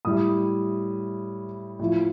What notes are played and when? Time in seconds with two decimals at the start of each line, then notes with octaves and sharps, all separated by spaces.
0.05 A2 G3 D#6
1.79 A2 F3